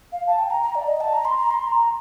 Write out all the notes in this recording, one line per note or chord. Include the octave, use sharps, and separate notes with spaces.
F5
A5
G5
A#5
A#5
D5
D#5
A5
A#5
C6
A#5
C6
C6
A#5